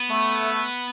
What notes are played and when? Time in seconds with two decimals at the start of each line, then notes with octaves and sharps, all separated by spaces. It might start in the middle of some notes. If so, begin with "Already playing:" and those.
Already playing: B3
0.10 A3